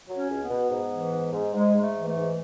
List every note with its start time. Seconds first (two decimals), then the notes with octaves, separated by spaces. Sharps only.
0.09 F#3
0.17 C#4
0.30 C#2
0.44 B3
0.50 B2
0.71 G#2
0.91 E3
1.12 G#2
1.32 G#2
1.53 G#2 G#3
1.75 G#2
1.82 A3
1.95 E3
2.08 A3
2.15 G#2